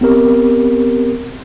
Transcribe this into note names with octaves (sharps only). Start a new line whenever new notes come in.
B3 C4 G4 A#4